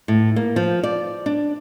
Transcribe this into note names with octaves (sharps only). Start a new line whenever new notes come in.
A2
A#3
F3
D5
D4